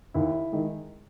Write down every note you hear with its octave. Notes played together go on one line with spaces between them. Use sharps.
D#2 E4
D#3 G#3